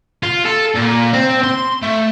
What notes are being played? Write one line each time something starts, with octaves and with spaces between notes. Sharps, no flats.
F4
A4
A#2
C4
C6
A3